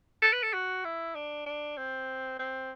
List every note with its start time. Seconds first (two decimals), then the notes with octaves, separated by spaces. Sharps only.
0.22 A4
0.33 B4
0.43 A4
0.53 F#4
0.84 E4
1.15 D4
1.46 D4
1.77 C4
2.39 C4